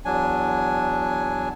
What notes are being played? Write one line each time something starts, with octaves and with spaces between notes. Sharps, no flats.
E2 F#3 D4 G#5